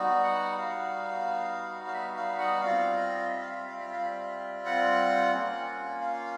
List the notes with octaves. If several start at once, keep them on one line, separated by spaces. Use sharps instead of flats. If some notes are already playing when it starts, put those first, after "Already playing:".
Already playing: G3 B3 D#4 F#4
F#5
F5
F5
E5
F5
F#5
G3 C4 F4 F5
D#5
E5
F5
E5
F5
E5
F5
E5
F#5
A#3 C#4 F4
F5